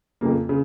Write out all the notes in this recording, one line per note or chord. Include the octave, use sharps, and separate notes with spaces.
F2 C#3 A#3
C#3